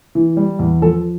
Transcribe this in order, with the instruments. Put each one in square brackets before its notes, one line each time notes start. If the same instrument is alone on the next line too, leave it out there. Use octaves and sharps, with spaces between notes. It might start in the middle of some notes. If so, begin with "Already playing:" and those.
[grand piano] E3
G3
E2
F3 A4